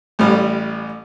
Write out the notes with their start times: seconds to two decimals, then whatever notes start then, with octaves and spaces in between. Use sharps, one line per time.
0.19 A1 A2 G3